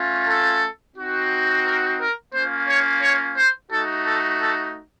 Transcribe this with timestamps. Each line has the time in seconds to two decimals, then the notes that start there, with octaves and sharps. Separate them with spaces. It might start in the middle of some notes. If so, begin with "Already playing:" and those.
Already playing: A3 C#4 F4
0.27 A4
0.96 C4 D#4 F#4
1.65 A#4
1.99 A#4
2.33 A#3 C#4 F4 C5
2.67 C#5
3.02 C#5
3.37 C5
3.71 A3 D#4 F#4 A4
4.06 A4
4.40 A4